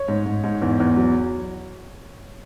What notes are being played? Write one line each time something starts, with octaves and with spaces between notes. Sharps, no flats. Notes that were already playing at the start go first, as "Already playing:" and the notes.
Already playing: C#5
G#2
G#2
G#2
E2
E2
F#3